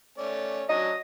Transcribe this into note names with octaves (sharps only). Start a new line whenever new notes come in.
A3 C#4 D5
F#3 C#4 D4 D#5